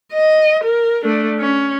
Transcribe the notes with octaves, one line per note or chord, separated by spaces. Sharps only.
D#5
A#4
A3 D4
C#4